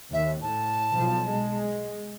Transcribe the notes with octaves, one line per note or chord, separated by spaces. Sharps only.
D#2 E5
A2 A5
B1 F3
G#3